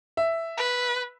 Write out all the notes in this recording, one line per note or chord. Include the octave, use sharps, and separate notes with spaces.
E5
B4